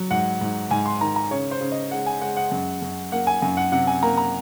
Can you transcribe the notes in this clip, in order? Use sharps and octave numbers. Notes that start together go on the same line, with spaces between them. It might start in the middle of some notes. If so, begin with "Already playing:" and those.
Already playing: F#3
G#2 F#5
G#2
G#2 G#5
C6
D#3 A#5
A#5
C#3 C#5
C5
C#3
D#5
G#3 F#5
G#5
G#3 F#5
F#5
F#2
F#2
A#3 F#5
G#5
F#2 G#5
F#5
C3 F#5
G#5
A#3 A#5
A#5